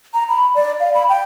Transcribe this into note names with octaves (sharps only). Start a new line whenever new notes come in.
A#5
B5
D5
F5
B5
G5